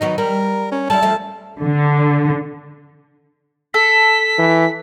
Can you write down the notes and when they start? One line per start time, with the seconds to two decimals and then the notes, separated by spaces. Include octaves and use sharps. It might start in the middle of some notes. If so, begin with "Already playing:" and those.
0.01 D#3 F#3 B3 D#4
0.18 G3 A#4
0.72 C#4
0.90 G3 E4 A5
1.03 F3 A3
1.62 D3
3.74 A4 B6
4.38 E3